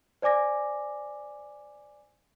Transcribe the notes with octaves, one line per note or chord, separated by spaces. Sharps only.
C5 D5 G#5 D6 A#6